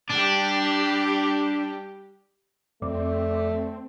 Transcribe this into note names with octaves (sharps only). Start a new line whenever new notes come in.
G3 D4 G4
F2 A3 C4 D5